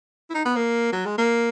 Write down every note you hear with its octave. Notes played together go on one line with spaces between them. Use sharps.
E4
D#4
B3
A#3
F#3
G#3
A#3